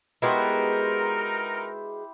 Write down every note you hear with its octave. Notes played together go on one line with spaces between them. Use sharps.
G#3 B3 D#4 E4 F#4 G4 A#4 C5